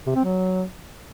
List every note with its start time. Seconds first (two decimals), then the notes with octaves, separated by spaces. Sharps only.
0.07 C3
0.16 C4
0.24 F#3